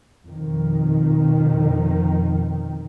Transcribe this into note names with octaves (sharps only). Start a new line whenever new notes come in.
F2 B2 D#3